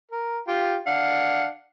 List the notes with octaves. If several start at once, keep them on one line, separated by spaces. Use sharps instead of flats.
A#4
F4 G4 G5
D4 F5 F#5